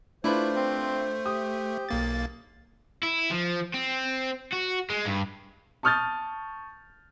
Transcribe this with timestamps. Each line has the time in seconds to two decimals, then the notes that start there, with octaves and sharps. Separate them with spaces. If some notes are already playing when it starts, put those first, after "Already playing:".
0.24 A3 D4 E4 F4 B4 C5
0.56 C4
1.26 G4 D#6
1.89 B1 A#3 A6
3.03 E4
3.31 F3
3.74 C4
4.52 F#4
4.90 G#3
5.06 G2
5.83 A5 C#6 D#6 F6 G6 A6